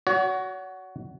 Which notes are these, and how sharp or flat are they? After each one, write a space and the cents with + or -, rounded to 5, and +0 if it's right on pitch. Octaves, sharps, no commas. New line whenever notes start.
F#4 +10 C#5 +40